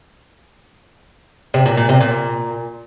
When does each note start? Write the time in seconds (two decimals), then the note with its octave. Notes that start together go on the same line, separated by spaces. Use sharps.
1.54 C3
1.66 A#2
1.77 A#2
1.89 C3
2.01 A#2